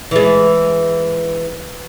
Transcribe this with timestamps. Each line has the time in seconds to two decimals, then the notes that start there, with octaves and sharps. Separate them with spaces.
0.11 E3 G#3